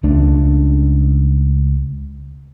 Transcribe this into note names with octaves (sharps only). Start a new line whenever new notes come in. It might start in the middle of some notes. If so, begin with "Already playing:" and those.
C#2 A3 D4